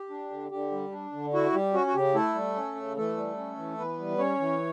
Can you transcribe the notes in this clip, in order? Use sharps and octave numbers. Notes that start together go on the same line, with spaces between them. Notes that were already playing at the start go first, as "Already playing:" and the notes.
Already playing: G4
D4
D3
D3 G4
G3
D4
D3
E4 F#4
G3 G4
C#4 F#4
F#4
C#3 G4
A3 E4 A4
G3
C#4
C#3
E3 A3 A4
G3
C#4
E3
E3 B3 B4
G3
C#4 C#5
E3